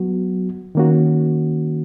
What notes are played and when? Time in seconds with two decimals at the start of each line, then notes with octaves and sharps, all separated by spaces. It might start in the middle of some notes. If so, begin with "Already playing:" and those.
Already playing: F#3 B3 F#4
0.75 D#3 A#3 C#4 F#4